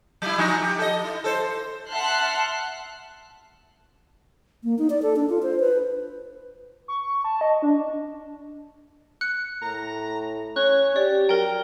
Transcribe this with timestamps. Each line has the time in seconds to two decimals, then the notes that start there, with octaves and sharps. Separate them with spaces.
0.22 F#3 E4
0.38 F3 D#4
0.61 G4
0.79 A4 D#5
1.04 E4
1.24 A4 C5
1.90 E5 F#5 A5 C6 F6 F#6
4.64 A#3
4.79 D#4
4.90 D5
5.02 A4
5.16 D4
5.29 F4
5.43 C5
5.60 B4
6.88 C#6
7.03 C#6
7.24 A5
7.41 D#5
7.62 D4
9.21 F#6 C#7
9.62 A2 A#5
10.56 C#4 C#5 F#6
10.96 G4 D5
11.29 F#3 A#4 G5 A#5